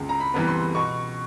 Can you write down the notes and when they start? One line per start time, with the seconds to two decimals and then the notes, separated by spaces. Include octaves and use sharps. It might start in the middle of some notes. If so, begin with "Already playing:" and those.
Already playing: C#2
0.09 A#5
0.20 B5
0.34 C3 E3 G3 B3
0.48 C6
0.75 B2 C#6